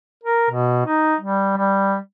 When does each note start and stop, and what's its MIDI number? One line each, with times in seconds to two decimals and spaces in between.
0.24 0.48 70
0.50 0.86 47
0.86 1.15 63
1.21 1.54 55
1.57 1.97 55